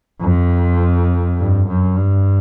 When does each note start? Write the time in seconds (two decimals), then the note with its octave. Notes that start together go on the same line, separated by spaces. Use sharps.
0.21 F2
1.37 G2
1.67 F#2
1.96 G2